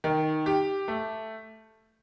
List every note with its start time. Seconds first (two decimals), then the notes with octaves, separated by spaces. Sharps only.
0.04 D#3
0.46 G4
0.88 A3